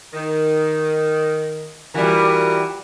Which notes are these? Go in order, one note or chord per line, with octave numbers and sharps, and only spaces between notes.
D#3
E3 G3 F4 F#4 A#4